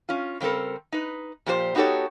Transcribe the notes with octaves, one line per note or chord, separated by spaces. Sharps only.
C#4 F4
C#3 G3 C4 A4 A#4
D#4 B4
A#2 F3 G4 A#4 C5
B3 D#4 F#4 G4 A4 C#5